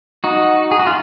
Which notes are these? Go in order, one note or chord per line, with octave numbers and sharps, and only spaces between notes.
D#4 F#4
G#4
F#4
F4